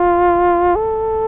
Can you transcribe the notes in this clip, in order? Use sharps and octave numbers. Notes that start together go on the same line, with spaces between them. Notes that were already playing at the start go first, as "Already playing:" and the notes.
Already playing: F4
A4